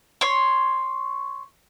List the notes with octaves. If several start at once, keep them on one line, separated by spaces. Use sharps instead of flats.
C#5 C6